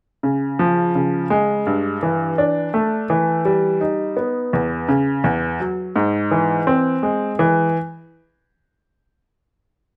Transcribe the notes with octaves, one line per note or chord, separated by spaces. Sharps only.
C#3
F3
C#3
G#3
G2
E3
D4
A3
E3
G3
D#4
B3
E2
C#3
E2
F#3
G#2
E3
C4
G#3
E3